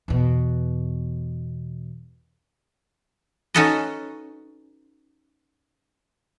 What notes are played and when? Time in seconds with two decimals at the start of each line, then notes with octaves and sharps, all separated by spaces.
0.08 E2 B2
3.54 C#4 D#4 F#4 A4 B4 D#5